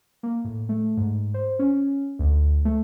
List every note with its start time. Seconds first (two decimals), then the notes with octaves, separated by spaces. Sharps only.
0.23 A#3
0.44 A2
0.69 A3
0.97 G#2
1.34 C5
1.59 C#4
2.19 D2
2.65 A3